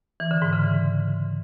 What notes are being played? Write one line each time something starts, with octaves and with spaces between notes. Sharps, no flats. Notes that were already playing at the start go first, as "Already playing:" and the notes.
E3
D3
G#2
C#3
E3